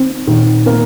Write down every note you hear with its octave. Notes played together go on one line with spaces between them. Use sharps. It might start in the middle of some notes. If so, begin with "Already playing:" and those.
Already playing: D#3 C4
A#2 D#3
A#3 C4